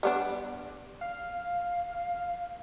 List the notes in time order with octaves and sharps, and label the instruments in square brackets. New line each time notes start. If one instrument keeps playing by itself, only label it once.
[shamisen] G3 B3 D4
[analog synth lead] F5